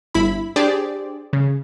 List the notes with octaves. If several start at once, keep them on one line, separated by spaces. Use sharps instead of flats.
G1 E4 B5
D4 G4 G#4 C5 D5
C#3